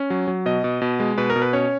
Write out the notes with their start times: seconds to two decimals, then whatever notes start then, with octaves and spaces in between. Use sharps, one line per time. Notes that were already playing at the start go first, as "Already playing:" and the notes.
Already playing: C#4
0.10 F#3
0.28 F#3
0.46 B2 D#5
0.64 B2
0.82 B2
1.00 G#3
1.18 B2 B4
1.30 A#4
1.36 B2
1.42 B4
1.53 C#4 C#5